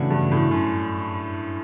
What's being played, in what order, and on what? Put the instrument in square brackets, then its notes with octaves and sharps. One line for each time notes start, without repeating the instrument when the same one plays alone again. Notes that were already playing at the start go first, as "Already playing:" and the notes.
Already playing: [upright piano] A2 [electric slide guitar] C#3 E3 A3 D4 F#4
[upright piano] G2
A2
F#2